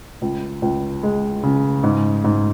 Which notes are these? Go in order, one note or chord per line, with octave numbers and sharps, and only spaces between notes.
C#2
C#2
G#3
C#3
G#2
G#2